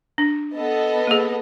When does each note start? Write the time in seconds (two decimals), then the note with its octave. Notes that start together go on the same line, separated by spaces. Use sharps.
0.18 D4
0.55 B3 A4 D#5
1.07 A#3 G#4